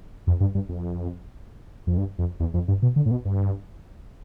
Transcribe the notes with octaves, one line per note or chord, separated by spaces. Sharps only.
F2
G2
G2
F2
F2
G2
F2
E2
F2
G2
B2
D3
A2
B2
G2